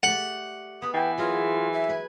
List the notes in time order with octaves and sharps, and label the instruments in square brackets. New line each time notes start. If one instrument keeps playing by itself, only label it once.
[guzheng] A3 G4 D5 [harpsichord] F#5
[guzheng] B3 B4 [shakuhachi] D#6
[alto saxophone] E3 [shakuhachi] G5
[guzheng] F#3 G#4 A#4 [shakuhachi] F4
[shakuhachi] E5
[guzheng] B4 G#5